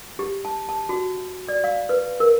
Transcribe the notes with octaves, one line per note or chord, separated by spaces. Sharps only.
G4
A5
A5
F#4
D5
F5
B4
A#4